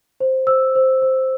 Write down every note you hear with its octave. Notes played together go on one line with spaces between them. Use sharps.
C5
C5 E6
C5
C5